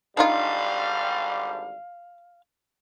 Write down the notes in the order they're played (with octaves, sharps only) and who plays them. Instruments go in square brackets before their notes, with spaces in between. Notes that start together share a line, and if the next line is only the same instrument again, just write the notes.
[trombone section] G#1 D3 G3 [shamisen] D4 D#4 F4 [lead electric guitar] F5